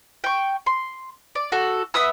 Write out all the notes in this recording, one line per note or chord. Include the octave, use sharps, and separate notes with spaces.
G5 C#6
C6
D5
F#4 A4
B3 E5 D#6 E6